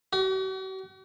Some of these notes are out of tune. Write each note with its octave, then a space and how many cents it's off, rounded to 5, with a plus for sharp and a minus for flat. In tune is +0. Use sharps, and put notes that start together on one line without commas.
F#4 +45